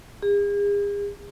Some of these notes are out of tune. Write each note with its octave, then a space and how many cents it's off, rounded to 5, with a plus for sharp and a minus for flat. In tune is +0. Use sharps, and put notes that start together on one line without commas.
G#4 -40